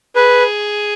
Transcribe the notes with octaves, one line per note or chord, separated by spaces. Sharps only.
G#4 B4